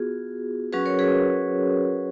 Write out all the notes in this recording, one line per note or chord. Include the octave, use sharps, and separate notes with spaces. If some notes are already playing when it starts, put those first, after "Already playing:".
Already playing: B3 F4 F#4 G#4
F#3 C#4 F#4 G#4 B4
A#4 C#5
G#4 B4